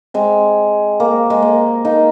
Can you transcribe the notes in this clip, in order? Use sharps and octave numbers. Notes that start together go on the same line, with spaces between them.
G#3 C4
A#3
G#3
A#3
A#3 D#4